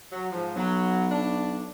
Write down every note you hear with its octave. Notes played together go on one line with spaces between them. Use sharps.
F#3
G#2 F3
B1 F#3
D4